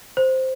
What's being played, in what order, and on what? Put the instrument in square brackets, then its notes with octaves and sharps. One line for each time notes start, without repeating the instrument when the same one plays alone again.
[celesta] C5